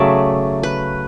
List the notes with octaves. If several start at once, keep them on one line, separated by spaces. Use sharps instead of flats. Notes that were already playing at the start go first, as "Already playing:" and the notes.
Already playing: C#3 F#3 A3 D5 E5
B4